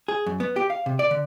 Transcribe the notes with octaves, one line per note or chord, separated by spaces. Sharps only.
G#4
F#2
B3
G4
F5
C3
D5
D3